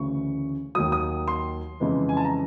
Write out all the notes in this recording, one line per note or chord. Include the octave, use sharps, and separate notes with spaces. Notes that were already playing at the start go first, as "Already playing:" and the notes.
Already playing: D2 C#3 E3 C#6
D#2 D#3 F#3 D#6
D#6
C6
F2 C#3 E3 G#3
G#5
A5
A#5